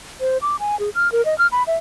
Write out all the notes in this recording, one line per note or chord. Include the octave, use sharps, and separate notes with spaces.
C5
D6
G#5
G#4
F6
A#4
D#5
F6
B5
E5